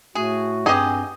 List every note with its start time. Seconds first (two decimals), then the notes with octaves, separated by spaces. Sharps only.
0.15 A2 A3 F#4 G#4
0.66 G2 B3 C4 G4 G#4 D#5 G#5